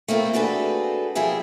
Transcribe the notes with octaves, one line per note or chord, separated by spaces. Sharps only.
A3 A#3 C4 E4 F4
C4 D4 F#4 G#4 A4 B4
F3 G3 E4 G#4 E5